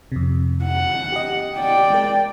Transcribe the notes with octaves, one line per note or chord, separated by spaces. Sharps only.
F2 C3
F#5
G4 D#5
D5 G5
G#3 A#4